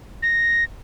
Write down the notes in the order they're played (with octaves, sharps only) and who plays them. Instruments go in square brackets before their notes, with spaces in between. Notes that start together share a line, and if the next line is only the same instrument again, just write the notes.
[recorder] A#6